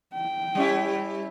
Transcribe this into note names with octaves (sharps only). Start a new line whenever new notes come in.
G5
G3 C#4 E4